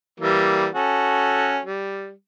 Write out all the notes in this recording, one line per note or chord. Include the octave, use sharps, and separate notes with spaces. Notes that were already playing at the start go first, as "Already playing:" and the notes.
E3 G3 A#3
C#4 F#4 A4
G3